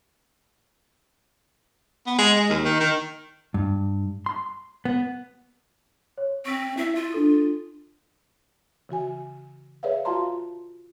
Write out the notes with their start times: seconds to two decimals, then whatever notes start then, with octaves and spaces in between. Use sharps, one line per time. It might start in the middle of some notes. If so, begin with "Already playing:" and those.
2.06 B3
2.18 G#3
2.36 G#3
2.49 D#2
2.65 D#3
2.80 D#3
3.54 G2
4.26 C6
4.85 B3
6.18 C#5
6.45 C4 C#6 B6
6.78 E4 E5 E6
6.95 F4
7.12 D4 A4 D#6
8.89 C#3 E3 F#4 G#5
9.83 G#4 B4 C#5 D5 E5 F5
10.05 F4 F#4 F5 A5 A#5 C6